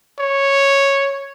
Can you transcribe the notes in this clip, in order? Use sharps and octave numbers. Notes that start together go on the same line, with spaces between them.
C#5